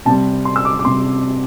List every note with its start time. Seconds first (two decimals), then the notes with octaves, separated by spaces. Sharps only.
0.05 C3 G3 C4 A5
0.45 C6
0.56 E6
0.65 D6
0.79 D6
0.84 C3 G3 C4 C6